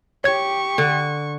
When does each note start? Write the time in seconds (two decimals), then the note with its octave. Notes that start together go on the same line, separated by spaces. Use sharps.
0.24 G4 C#5 C#6 G#6
0.78 D3